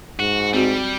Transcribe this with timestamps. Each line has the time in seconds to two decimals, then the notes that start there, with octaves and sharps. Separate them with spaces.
0.19 G#2 F#4
0.53 G3 C4 F#4